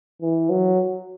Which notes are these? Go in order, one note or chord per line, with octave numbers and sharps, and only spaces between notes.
E3
F#3